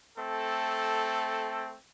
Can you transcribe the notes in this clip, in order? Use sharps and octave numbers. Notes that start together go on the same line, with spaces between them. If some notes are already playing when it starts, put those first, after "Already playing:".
A3 C4 A4